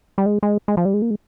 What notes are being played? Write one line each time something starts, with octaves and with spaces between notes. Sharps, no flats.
G3
G#3
G#3
G#3
F3
G3
G#3
A#3
G#3